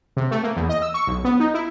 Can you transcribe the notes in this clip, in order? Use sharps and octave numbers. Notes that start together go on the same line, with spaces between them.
C3
A3
A#3
E2
D#5
E6
C#6
B1
B3
D#4
E4